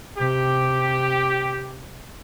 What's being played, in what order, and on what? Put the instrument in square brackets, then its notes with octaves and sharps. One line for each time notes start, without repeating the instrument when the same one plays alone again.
[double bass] C3 [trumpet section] G4